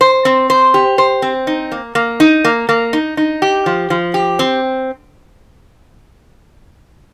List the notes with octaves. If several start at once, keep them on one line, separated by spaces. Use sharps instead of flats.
C5
C4
C5
G4
C5
C4
D#4
A#3
A#3
D#4
A#3
A#3
D#4
D#4
G4
F3
F3
G4
C4